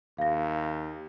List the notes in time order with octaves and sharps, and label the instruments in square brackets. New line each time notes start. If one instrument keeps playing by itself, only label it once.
[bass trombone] D#2 [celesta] F5 A#6